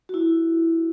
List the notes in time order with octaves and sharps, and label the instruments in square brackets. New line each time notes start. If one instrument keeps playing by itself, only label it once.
[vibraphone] F#4
E4